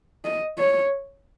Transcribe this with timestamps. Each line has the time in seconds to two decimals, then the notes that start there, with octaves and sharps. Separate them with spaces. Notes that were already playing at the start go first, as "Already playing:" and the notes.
0.25 D#5
0.58 C#5